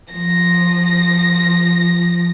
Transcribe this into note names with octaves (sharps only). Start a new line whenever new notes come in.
F3 A#6